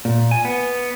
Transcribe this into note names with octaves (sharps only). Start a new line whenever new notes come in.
A#2
G#5
B3